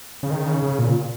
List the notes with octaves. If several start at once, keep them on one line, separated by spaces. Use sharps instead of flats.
C#3
D#3
C#3
C#3
A#2